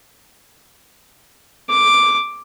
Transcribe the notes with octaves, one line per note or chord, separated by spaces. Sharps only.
D6